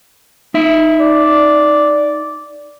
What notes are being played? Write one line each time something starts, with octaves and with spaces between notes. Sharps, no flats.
D#4 E5
D5